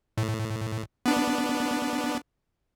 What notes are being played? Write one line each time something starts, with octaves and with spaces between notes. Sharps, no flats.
A2
B3 D4